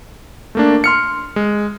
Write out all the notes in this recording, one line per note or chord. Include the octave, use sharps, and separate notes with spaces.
A3 A#3 D4
C6 F6 C#7
G#3